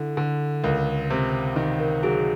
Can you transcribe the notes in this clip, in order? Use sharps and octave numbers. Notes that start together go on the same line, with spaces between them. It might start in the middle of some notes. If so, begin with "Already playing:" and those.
Already playing: D3 E4 A4
D3
C#2 A#4
C3
D#3
A#4
F#3 G#4